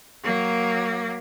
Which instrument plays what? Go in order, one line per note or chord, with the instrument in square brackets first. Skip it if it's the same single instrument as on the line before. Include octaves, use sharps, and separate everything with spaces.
[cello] F#3 A#3